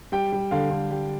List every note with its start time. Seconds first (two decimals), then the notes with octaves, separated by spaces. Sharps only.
0.12 G3 G5
0.32 G3
0.51 D3 F5
0.71 D3
0.91 G3